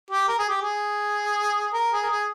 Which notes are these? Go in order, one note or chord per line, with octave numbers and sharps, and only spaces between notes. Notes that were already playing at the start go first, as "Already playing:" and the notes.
G4
A#4
G#4
G4
G#4
A#4
G#4
A#4
G#4